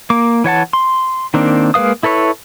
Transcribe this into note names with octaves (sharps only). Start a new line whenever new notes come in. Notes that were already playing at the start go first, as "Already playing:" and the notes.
A#3 D6
E3 C#5 F#5 A5
C6
D#3 A#3 C4 D4
G#3 A#3 B4 F5 D#6
E4 A4 B4 C#5